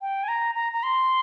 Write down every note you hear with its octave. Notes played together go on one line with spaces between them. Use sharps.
G5
G#5
A#5
A#5
A#5
C6